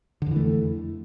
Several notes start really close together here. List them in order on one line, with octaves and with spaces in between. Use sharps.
D3 F2 E3 A3